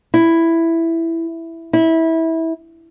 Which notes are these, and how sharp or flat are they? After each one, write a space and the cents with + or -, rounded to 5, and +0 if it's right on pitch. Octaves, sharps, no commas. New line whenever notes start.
E4 +5
E4 -20